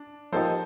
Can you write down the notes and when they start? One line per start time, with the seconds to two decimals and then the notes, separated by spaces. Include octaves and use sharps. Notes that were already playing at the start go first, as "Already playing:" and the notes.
Already playing: D4
0.32 F3 A#3 D#4 G4 A4 C5